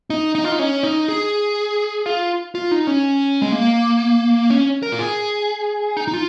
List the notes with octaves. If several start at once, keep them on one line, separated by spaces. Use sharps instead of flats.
D#4
D#4
F4
D#4
C#4
D#4
G#4
F4
F4
D#4
C#4
G#3
A#3
C#4
A#4
F4
G#4
D#4
D#4
F4